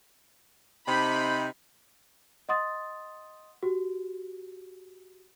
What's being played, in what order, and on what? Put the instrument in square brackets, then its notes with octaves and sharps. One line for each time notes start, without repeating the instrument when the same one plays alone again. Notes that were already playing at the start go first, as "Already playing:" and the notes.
[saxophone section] C3 D#4 [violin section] B5
[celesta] D#5 F#5 C6 D#6 A6
F#4 G4